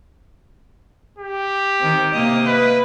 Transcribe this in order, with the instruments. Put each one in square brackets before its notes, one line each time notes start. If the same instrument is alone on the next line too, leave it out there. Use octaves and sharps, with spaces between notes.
[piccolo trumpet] G4
[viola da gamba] D#3 C4
C3 A#3 D#5
[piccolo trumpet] B4